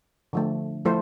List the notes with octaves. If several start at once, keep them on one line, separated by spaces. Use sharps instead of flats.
D3 F3 A3
F3 A3 E4 A4 C5